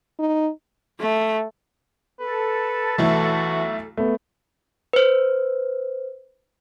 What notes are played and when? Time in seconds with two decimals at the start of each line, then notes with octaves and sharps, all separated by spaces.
0.19 D#4
1.00 A3
2.20 A4 B4
2.98 B1 E3 A3 E4 F#4
3.97 A3 B3
4.93 B4 C5